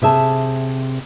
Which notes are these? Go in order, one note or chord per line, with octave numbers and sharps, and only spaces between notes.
C3 G#4 E5 A5